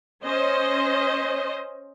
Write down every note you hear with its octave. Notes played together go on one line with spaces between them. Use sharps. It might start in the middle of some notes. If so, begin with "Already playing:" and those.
C#4 C5 D#5